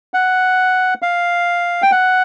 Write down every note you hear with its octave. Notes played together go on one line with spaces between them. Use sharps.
F#5
F5
G5
F#5